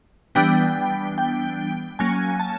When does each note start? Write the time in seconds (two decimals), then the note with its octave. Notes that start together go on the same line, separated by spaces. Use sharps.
0.35 E3 G3 B3 D4 G5
1.18 G5
1.99 F#3 A#3 C#4 G#5
2.40 A5